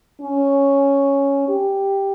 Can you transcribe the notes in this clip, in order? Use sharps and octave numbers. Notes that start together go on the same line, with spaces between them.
C#4
G4